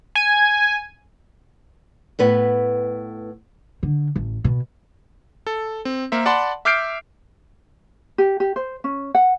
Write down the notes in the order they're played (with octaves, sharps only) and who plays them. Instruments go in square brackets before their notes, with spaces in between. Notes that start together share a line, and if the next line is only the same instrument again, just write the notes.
[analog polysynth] G#5
[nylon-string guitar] A2 B3 B4
[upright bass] D3
A1
B2
[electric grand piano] A4
C4
A#3 A#4 C5 E5
D5 F#5 A5 B5 C6
E5 D6 F6 G6 C7 D7
[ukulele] G4
G4
C5
C#4
F#5